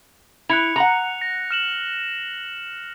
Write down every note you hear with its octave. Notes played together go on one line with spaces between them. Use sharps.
E4 F#6 C#7 F7
F#5 A#5
A#6
F6 E7 F#7